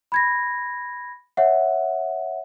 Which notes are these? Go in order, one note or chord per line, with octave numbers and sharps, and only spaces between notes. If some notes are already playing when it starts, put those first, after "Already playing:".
B5 G#6 A#6
C#5 E5 F#5